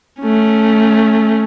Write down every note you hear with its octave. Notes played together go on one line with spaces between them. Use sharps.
A3 C#4